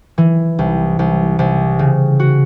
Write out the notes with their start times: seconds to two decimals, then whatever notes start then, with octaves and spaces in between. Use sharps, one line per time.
0.18 E3
0.59 C2
0.99 C2
1.39 C2
1.79 C#3
2.20 F#4